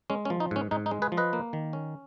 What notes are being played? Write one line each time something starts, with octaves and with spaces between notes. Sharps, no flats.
G#3 C#4
C#4
F3
D#4
G#2 C#4
G#2 D#4
D#4
G#3
G#4 B4
F3
B4 D#5
A#3
D#3
C#4